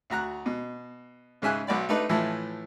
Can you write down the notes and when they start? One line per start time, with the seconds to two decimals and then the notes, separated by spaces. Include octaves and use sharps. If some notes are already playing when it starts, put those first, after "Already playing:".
0.10 D2 F#4 A#5 F#6
0.46 B2
1.42 G#2 C#3 E5 G#5 F#6
1.67 B1 F#4 D5 B5
1.89 A3 D4 D#4 B4
2.09 A2 E3 F3 A3